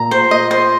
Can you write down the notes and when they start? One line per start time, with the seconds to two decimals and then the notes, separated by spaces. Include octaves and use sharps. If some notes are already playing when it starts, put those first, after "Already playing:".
Already playing: A#2 A#5
0.11 C5
0.31 D#5
0.51 C5